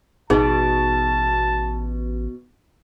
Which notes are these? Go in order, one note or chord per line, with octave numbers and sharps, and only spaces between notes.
A1 B2 D#4 G#4 A5